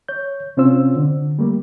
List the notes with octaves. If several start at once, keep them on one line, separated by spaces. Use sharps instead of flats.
C#5 G6
C3 C4 C#4 F4 C5 E6
D3
G3 A3 A#3